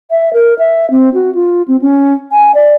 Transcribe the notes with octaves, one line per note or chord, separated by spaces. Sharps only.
E5
A#4
E5
C4
F#4
F4
C4
C#4
G#5
D5